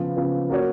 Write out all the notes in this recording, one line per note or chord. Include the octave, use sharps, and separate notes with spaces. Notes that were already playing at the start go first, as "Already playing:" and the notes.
Already playing: C#3 F3 B3
C#3 F3 B3
A#3 C#4 F#4 C#5